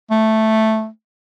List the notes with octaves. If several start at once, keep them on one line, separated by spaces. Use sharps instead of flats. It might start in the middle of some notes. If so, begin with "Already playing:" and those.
A3